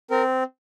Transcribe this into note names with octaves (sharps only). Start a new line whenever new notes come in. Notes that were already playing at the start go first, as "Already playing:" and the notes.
C4 A#4